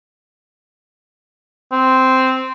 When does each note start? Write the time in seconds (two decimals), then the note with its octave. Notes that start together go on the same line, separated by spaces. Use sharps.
1.72 C4